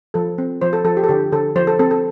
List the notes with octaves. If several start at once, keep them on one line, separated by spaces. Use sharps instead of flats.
F3 A4
C4
F3 C5
A4
F3 A4
G4
A4
D3 G4
D3 A4
F3 C5
A4
C4 A4
A4